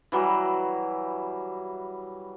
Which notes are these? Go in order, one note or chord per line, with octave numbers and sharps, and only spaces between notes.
E3 F#3 G3